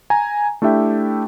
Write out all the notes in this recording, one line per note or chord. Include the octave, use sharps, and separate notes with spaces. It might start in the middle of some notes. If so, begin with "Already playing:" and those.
G#5 A#5
A3 D4 E4 G4 E5 G5